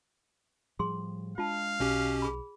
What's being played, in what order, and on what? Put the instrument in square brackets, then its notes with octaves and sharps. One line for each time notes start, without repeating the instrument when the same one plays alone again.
[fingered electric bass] A2 F3 G3 [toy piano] G#4 C6
[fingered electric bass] G#3 D4 [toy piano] F4 A5 [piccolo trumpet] F5
[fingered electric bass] B1 [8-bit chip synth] B2 C#4 G4
[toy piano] G#4 B5